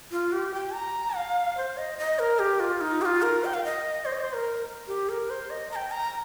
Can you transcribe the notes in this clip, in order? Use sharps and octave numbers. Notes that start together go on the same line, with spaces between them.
F4
G4
G5
A#5
F5
C5
D#5
D#5
A#4
G4
F4
D#4
G4
F4
A#4
G5
F5
D#5
C5
D#5
C5
A#4
G4
A#4
C5
D#5
A#5
G5
A#5